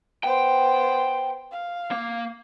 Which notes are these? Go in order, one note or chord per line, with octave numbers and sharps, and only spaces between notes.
B3 C5 G5
F5
A#3